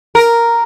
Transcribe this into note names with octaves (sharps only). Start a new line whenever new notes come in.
A#4